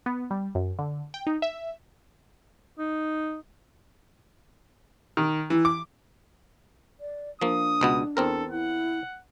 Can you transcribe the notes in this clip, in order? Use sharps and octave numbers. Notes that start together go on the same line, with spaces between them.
B3
G3
F#2
D3
G5
D#4
E5
D#4
D#3
E3
D6
D5
F3 A#3 D4 D#6
C#2 B2 B3
E2 C4 A4 A#4
E4 F#5